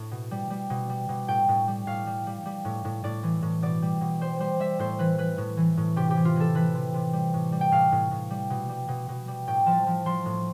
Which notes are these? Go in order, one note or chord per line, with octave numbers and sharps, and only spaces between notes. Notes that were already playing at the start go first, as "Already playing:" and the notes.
Already playing: A2 E5
B2
G3
G3
B2
G3
B2
A2 G5
A2
G3
A2 F5
G3
G3
G3
A2
A2
A2 D5
E3
A2
B2 D5
G3
B2
G3 C5
G3 C5
G3 E5
A2 C5
E3 B4
E3 B4
A2
E3
A2
C3 G4
G4
E3
F4
E3 A4
E3 B4
C3
C3
G3
A2
G3
G5
A2 F5
A2
A2
G3
B2
G3
B2
B2
G3
A2 G5
F3 A5
F3
F3 C6
A2